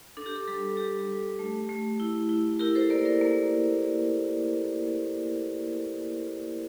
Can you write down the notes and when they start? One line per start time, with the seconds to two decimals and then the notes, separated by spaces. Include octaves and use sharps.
0.17 D4 A4
0.26 G4
0.36 A4
0.48 G3 A4
0.77 G3 G4
1.08 G3
1.39 A3
1.69 A3
2.00 E4
2.29 E4
2.59 E4 G4 A#4
2.75 A4 C5
2.90 A#3 A#4 D5
3.05 A#4 D5
3.21 A#3